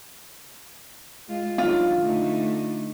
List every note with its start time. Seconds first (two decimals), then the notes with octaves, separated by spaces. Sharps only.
1.27 G#3 F4
1.58 D#3 F#3 D4 F4
2.00 D3 A3 D#4